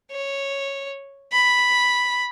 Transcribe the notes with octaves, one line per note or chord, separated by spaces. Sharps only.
C#5
B5